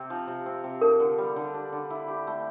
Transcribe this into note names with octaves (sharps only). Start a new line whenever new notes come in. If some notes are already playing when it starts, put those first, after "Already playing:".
Already playing: C3 C4
F3
C3
C4
C3
D4 A#4
D3
G3
D3
D4
D3
E4
G4
A3